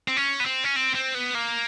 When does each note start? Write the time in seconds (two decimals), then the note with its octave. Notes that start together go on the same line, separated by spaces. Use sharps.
0.08 C4
0.17 C#4
0.40 B3
0.45 C4
0.64 C#4
0.76 C4
0.95 C4
1.15 B3
1.35 A#3